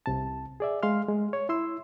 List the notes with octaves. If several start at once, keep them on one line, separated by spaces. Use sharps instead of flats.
C2 C3 A5
G#4 D5 E5
G#3 F5 C6 F6
G#3
C#5
E4 C6 E6